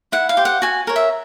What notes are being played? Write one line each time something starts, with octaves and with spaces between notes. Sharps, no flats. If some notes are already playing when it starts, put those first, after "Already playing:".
E4 F#5
F5
G4 C5
F#5
F#4 G#5
A#4 C#5
E5